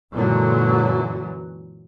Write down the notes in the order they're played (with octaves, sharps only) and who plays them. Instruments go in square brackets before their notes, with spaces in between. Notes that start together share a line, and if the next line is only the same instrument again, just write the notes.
[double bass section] F#2 A#2 D3 E3 F#3 G#3